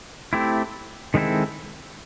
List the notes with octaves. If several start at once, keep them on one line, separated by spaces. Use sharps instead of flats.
A3 C4 E4 G4
D#3 G#3 C4 E4 A4